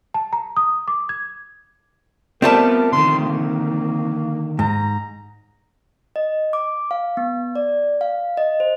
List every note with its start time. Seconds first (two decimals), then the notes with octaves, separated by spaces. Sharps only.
0.14 A5
0.33 A#5
0.57 D#6
0.88 D6
1.09 G#6
2.42 G3 A3 B3 C4 F4 A#4 D5 A5
2.92 D3 D#3 C6
3.19 A#3
4.59 G#2 A#5
6.16 D#5
6.53 D6
6.91 F5
7.17 B3
7.56 D5
8.01 F5
8.37 D#5
8.60 C5